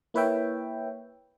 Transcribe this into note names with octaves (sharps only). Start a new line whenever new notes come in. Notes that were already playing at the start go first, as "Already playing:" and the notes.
A#3 E4 B4 C#5 E5 G5